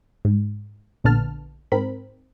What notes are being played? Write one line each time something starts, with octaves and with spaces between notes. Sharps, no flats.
G#2
A#1 A#2 D3 B3 A5 F6
G#2 C4 A#4 B5